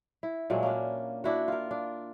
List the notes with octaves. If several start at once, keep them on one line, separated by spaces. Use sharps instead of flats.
E4
A#2 F#3 G#3 A3
A#3 C#4 D4
D4 E4 F#4
F4 A#4
D4